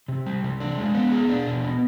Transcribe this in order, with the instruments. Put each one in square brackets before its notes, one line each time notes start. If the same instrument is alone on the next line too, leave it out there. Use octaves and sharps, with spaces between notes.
[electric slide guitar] C3
G3
C3
D4
G#3
B3
G#4
D4
B2
B3